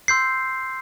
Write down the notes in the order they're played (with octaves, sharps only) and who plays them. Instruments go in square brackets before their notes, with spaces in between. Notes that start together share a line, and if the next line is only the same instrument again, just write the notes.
[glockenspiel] C6 E6 G6 C7